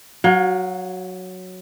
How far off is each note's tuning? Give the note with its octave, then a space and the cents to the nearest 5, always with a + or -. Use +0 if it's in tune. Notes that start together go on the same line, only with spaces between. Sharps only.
F#3 +0 F5 +35